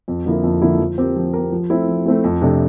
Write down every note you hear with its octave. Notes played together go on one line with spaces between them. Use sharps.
F2
D3 F3 A#3 E4
F2
D3 F3 A#3 E4
F3
C4 G4 A#4
F3
C4 G4 A#4
F3
A3 C4 E4
F3
A3 C4 E4
F2
C3 F3 A3 D4